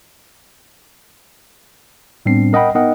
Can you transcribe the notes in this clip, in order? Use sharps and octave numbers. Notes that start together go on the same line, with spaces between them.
A2 G3 B3 C4 D4 C7
A#4 D#5 F#5 G5 B5
B3 D#4 A#4 D#5 F#5 G5